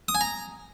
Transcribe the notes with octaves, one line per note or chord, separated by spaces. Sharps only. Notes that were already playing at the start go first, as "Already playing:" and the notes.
D#6
G#5
A#5